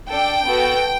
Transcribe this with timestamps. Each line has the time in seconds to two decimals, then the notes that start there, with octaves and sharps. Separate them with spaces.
0.11 D4 A4 G5
0.46 B3 F#4 A4